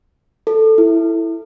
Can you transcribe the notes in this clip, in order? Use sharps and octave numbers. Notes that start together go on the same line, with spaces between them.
A4
E4